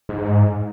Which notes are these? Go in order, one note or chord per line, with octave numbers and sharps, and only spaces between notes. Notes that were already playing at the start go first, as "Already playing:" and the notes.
G#2